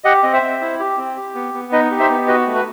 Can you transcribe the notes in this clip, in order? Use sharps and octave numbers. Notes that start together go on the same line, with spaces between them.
G4 D#5 F#5
C4 D#5
C5 E5
C4
E4
G4
C4
G4
B3
B3
D#4 B4 D#5
G4
C5 E5
B3
F#4 B4 D#5
A3
B4